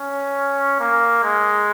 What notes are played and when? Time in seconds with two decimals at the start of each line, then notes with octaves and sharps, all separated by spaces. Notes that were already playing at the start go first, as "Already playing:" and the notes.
Already playing: C#4
0.80 A#3
1.23 G#3